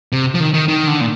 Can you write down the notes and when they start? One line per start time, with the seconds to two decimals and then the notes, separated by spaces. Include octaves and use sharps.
0.12 C3
0.35 F3
0.40 D#3
0.54 D#3
0.68 D#3
0.87 D3
1.01 A#2